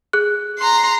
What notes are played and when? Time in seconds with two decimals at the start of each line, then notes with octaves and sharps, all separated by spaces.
0.13 G#4 F#6
0.59 A#5 C6